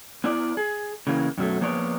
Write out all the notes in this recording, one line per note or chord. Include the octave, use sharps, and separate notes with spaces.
B3 E4 D5
G#4
C#3 E3 A#3
F#2 B2 F#3 A3
F3 A#3 B3 G#4 C#5 D5